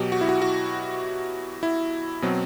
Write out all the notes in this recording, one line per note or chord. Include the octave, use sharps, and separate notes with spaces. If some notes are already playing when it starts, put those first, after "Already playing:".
Already playing: B2 F#3 G4
F#4
E4
F#4
F#4
E4
B2 F#3 C4